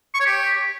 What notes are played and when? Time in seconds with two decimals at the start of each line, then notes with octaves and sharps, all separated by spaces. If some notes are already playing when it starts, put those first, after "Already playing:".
0.15 C#6
0.20 C#5
0.26 G4